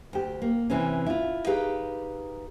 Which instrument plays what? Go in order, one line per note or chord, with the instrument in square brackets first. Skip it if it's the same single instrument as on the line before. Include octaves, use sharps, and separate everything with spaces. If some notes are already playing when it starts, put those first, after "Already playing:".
[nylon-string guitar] D2 G4
A#3
C3 E3 C4 C#4
E4 F4
D#4 G4 G#4 B4 F5